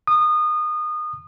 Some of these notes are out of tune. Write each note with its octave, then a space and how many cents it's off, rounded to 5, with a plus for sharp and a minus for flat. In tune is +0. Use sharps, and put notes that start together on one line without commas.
D#6 -25